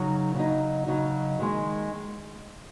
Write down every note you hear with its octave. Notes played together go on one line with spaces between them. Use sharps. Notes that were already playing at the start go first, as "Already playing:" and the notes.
Already playing: C#3 F#3 D#4
C#3 F#3 D#4
C#3 F#3 D#4
D#3 G#3 D#4